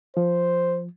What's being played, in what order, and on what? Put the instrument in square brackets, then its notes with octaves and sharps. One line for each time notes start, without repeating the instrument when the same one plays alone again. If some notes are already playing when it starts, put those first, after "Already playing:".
[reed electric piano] F3 [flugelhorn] C5